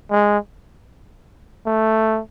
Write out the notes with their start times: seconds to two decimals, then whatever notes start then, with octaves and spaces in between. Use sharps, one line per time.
0.11 G#3
1.66 A3